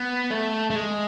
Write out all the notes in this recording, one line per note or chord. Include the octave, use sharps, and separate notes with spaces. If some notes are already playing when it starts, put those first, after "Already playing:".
Already playing: B3
A3
A3
G#3